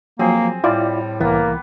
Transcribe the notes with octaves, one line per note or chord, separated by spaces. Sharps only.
F3 F#3 A#3 C4 G#4
A2 G3 E4 F4 D5
C2 E3 A#3 B3